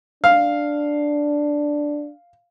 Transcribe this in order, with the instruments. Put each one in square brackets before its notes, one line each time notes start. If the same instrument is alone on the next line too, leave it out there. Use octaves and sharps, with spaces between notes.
[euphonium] D4 [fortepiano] F5